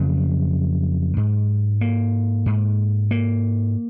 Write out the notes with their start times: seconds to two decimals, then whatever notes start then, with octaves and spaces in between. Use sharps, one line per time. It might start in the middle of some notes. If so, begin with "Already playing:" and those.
Already playing: F2 C#3 F#3
1.17 G#2
1.81 A#3
2.46 G#2
3.11 A#3